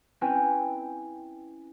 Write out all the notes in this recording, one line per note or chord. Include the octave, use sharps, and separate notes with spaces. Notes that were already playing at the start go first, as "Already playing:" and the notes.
C4 C#4 E4 B4 G5 G#5